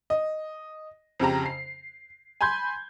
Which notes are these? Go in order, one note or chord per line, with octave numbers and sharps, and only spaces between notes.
D#5
F2 C#3 G4 A#5
C7
G#5 B5 C6 G6 G#6